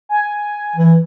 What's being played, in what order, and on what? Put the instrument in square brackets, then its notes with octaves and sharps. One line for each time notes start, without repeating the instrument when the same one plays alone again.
[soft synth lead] G#5
[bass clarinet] E3